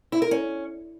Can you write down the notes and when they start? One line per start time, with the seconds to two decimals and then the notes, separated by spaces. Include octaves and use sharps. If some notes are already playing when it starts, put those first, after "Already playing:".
0.12 E4
0.22 A#4
0.31 C#4